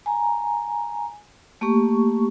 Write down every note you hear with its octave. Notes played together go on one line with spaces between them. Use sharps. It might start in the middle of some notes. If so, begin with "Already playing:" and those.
G#5 A#5
A3 A#3 G4 C#6